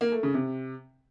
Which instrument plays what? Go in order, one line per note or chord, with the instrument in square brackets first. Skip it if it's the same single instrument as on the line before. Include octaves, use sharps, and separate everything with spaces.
[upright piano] A#3
A3
C#3
C3